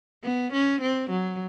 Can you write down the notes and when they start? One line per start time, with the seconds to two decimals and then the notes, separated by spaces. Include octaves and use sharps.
0.24 B3
0.53 C#4
0.81 C4
1.10 F#3